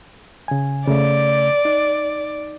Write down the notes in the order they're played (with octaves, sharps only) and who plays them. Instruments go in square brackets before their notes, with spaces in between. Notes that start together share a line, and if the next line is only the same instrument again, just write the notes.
[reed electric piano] C#3 G#5
[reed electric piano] C#3 A3 [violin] D5
[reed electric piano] D#4